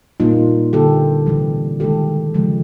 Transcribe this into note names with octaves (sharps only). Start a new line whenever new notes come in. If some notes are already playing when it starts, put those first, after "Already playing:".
A#2 G3 A#3 D#4 F4
D3 G3 A#3 G4 A4
C3 E3 G3
D#3 G#3 G4 A4
C#3 F3 G#3